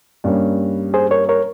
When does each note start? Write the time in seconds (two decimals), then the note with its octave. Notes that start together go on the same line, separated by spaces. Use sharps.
0.24 G2 G3 A#3 C#4
0.94 G#4 C5
1.11 A#4 C#5
1.29 A#4 C#5